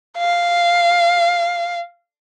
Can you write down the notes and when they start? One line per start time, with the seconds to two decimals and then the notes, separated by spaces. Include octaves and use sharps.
0.18 F5